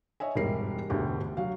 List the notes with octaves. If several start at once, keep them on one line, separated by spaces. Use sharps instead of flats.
C#5 D#5 E5 G#5
E1 G#2 G3 A#4 C7
E1 D2 G4
F#3 F5